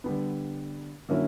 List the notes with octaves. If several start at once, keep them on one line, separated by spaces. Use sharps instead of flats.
D3 G3 B3
D3 F#3 A#3 C#4 E4